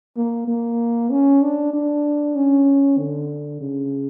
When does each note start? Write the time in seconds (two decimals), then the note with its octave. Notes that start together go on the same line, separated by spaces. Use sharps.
0.16 A#3
0.47 A#3
1.10 C#4
1.42 D4
1.73 D4
2.35 C#4
2.98 D3
3.60 C#3